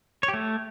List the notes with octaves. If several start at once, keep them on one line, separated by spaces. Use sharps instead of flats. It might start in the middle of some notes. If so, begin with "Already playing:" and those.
C#5
G4
A3